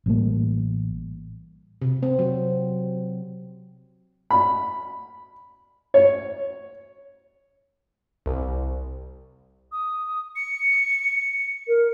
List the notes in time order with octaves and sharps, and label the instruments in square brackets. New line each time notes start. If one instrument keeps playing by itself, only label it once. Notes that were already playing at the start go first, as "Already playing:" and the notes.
[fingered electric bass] A1 G3 A#3
[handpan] C3
C4
F#3
[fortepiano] B5
C#5
[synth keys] C2
[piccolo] D#6
C#7
[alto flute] A#4